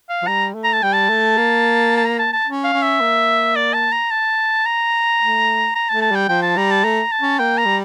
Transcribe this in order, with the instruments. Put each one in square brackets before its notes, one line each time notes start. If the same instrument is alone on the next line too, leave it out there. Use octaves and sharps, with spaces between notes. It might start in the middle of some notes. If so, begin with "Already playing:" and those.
[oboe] F5
[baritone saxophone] F3
[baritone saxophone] G3 [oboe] A#5
[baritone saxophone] A3
[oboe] A#5
A5
[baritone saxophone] G3 [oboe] G5
[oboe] A5
[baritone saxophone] A3
A#3
[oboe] A5
A#5
A5
A5
[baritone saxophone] C#4
[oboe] F5
[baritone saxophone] C#4
[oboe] E5
[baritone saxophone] A#3
[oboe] D5
A5
A#5
A5
A#5
[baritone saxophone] A3
[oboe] A#5
[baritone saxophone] A3 [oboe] A5
[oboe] A5
[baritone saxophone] G3 [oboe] G5
[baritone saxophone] F3 [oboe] G5
[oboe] A5
[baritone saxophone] G3 [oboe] A#5
[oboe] A5
[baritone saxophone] A3 [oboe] A#5
[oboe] A5
[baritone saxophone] C#4
[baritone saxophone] A#3 [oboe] G5
[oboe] A#5
[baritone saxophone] G3